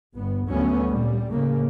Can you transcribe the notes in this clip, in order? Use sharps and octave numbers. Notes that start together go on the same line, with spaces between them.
G1 B3
D2 F#3 A3 B3 C#4
A#2 G3
A2 C#3 A#3